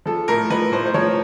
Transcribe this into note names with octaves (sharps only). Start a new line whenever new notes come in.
F3 A4
A2 A#4
F3 B4
A2 C5
C5
F3 C#5